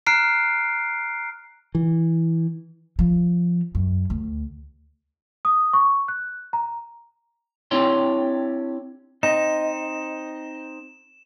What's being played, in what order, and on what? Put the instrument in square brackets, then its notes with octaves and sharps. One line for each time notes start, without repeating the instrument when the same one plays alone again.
[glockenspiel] A#5 F6 F#6 C7 D7
[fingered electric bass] E3
[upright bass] F3
F#2
D2
[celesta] D#6
C#6
F#6
A#5
[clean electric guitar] C4 D4 E4 G4 C#5 C6
[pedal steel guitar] C4 D#4 [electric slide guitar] D#5 [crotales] E7